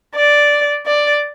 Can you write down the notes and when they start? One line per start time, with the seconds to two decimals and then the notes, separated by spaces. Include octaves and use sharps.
0.15 D5
0.86 D5